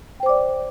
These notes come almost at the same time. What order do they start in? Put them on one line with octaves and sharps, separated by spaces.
G5 C5 D6 D5